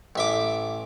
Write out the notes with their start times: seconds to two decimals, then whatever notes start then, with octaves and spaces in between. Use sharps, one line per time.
0.16 A1 E5 D6